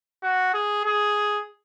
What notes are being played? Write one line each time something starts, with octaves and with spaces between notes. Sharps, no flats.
F#4
G#4
G#4